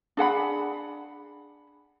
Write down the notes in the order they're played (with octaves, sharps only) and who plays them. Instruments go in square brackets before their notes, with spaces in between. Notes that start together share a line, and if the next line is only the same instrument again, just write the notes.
[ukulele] D4 G#4 F#5 B5